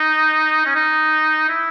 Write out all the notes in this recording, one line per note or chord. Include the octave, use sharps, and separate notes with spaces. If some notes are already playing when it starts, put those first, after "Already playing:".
Already playing: D#4
C#4
D#4
E4